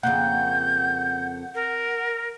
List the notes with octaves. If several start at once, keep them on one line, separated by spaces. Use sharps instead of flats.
F2 C#3 A#3 F#5 G6
A#4